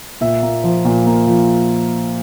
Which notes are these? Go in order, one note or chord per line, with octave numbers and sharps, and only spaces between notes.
A#2 E5
A#3
F3
A#2
A#3
F3